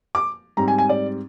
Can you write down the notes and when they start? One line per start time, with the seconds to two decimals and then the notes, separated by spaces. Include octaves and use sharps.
0.15 D6
0.57 G#2 G3 C4 A#5
0.68 G#5
0.78 G#5
0.89 D5